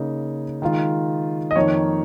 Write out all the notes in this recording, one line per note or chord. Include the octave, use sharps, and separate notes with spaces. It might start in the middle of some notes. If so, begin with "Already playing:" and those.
Already playing: C#3 A#3 D#4
D#3 G#3 F4
D#5
F2 D#3 A#3 D#4 C#5